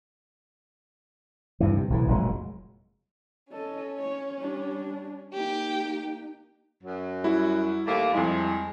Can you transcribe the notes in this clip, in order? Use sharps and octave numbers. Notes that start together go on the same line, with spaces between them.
D2 G2 E3
C3
B1 A2 E3
F1 A#2 F#3 G#3
C#4 A4 D#5
C#5
G3 D4
A#3 D#4 G4 G5
F#2 F#3
G3 E4 F#4
D#2 A3 A#3
F2 G3 G#3 E4